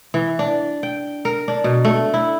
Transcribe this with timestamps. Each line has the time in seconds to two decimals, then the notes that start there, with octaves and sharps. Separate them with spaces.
0.14 E3
0.39 D4
0.83 G5
1.25 A#4
1.48 D4
1.64 B2
1.85 A3
2.14 E4